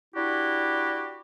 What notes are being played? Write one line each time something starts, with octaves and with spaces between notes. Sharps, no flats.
D4 E4 F#4 G4